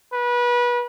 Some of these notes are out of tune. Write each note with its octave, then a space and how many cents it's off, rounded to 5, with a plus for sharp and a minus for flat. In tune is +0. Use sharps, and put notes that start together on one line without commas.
B4 -25